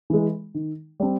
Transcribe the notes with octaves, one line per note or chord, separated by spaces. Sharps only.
E3 G#3
D#3
G3 C4